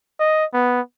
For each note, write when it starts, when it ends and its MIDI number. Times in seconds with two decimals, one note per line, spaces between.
0.19 0.45 75
0.53 0.81 59